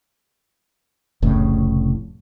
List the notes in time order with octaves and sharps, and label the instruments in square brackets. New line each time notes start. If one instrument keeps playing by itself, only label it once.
[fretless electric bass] F1 C2 A2 C#3